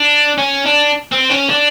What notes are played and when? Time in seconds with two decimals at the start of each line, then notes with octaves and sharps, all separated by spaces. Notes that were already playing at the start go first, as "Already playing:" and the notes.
Already playing: D4
0.38 C#4
0.66 D4
1.12 C4
1.30 C#4
1.49 D4